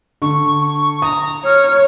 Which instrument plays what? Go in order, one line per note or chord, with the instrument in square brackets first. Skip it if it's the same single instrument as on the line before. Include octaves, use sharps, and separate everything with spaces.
[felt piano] D3 [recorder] C#6
[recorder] C#6
[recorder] A#5 [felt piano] D#6
[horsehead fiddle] C#5 [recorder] F6